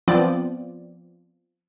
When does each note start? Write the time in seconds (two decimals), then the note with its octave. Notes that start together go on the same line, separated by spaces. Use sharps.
0.08 F3 B3 C4 D5